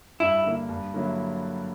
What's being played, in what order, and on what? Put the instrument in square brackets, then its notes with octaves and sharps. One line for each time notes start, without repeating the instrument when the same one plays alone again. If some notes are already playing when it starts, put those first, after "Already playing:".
[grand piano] G2 [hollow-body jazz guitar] E4
[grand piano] D3 A#3
G2
D3 F#3 A#3 E4